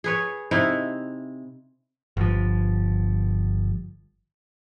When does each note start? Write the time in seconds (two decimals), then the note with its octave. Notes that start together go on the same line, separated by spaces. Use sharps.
0.04 G#4 B4 C#5
0.51 C3 D#4 E4
2.17 G1 F3